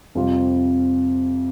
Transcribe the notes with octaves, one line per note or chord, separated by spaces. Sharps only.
F2 C3 G3 F4